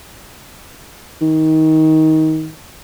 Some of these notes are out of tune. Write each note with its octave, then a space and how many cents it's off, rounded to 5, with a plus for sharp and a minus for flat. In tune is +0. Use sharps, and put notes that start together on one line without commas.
D#3 +20